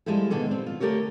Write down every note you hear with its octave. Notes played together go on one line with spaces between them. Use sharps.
F3 G3 G#3 E4 G4 A4
B2 D3 D#3 G#3 D4 A4
C4
F4
D3 A3 G4 A4 A#4 C#5